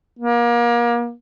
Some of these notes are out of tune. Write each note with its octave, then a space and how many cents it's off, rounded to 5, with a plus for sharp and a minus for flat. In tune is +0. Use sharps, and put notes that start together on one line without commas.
A#3 +30